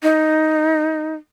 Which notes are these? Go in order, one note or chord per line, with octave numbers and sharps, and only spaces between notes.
D#4